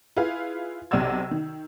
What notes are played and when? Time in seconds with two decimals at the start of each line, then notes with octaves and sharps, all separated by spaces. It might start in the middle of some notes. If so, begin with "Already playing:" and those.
0.17 E4 F4 G#4 B4 F5
0.91 B1 C3 D5 F#5 E6 G#6
1.31 D#3